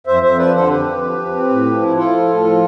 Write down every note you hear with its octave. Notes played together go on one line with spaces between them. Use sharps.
F2 C5 E5
F2 C5 E5
F3 B4 D5
D3 A4 C5
F2 G4 B4
F2
F3
F3
C4
A2
F3
E4
E4 F4 A4
F3
A2
F3